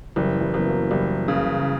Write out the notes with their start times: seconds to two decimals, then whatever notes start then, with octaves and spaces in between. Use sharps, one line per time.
0.16 F#1 E3 G3
0.41 E3 G3
0.54 F#1 B3
0.66 F#3 A#3
0.91 F#1 E3 G3
1.28 C#3